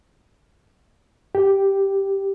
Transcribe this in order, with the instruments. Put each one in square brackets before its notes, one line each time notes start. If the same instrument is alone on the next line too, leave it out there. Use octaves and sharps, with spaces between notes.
[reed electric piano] G4